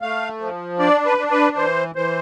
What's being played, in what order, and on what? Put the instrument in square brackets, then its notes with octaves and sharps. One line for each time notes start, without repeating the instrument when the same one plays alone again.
[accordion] A3 F5
F3
D4 D5
B4
D4
B4
E3 C5
E3 C5